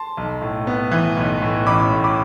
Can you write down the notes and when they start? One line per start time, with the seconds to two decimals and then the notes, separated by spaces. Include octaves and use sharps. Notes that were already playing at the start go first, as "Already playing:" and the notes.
Already playing: A5 C6
0.17 B1
0.41 A2
0.67 B3
0.92 E3
1.17 B1
1.42 A2
1.66 A1 B5 D6
1.92 A2
2.04 B5 D6